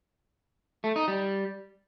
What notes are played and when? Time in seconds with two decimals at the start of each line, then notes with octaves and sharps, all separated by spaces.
0.84 A3
0.96 D#4
1.08 G3